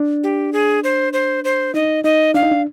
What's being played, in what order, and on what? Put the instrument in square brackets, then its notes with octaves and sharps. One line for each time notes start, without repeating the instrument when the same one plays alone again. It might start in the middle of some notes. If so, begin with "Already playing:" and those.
Already playing: [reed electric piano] D4
[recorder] G4
G#4
C5
C5
C5
[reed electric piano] D#4 [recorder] D#5
[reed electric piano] D#4 [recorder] D#5
[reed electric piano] D4 [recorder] F5
[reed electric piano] D#4
D4